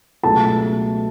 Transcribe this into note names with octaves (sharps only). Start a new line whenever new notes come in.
C#2 B2 F#3 A3 A4 A5